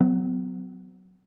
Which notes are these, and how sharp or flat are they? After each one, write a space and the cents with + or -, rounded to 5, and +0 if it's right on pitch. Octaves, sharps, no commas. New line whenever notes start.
F#3 +0 B3 +40